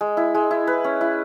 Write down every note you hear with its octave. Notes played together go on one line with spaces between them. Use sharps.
G#3
E4
G#3
E4
B4
C#4
E4